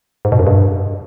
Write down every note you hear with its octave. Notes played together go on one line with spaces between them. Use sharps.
G#2
B2
F#2
G2